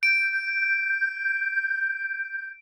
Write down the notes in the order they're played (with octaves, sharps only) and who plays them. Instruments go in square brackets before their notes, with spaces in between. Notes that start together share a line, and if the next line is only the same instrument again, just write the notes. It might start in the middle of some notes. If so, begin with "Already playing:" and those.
[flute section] G6 [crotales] D7